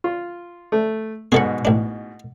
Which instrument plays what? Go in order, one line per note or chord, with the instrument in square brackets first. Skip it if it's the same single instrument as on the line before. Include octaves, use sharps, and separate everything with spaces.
[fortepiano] F4
A3
[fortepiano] G#2 B2 [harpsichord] G#4 A4 F#5
[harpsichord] A1 D4